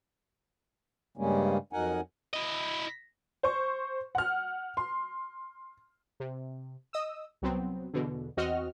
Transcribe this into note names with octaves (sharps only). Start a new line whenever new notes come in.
G2 C#3 G3 G#3 A#3 C#4
F2 F#3 D#4 A#4 F#5 G#5
E4 D#5
C5 C#6
F#5 F6
C6
C3
D#5 D#6 E6
C2 F#3 B3 C4
E2 B2 D3
E2 C4 F#4 D#5 F6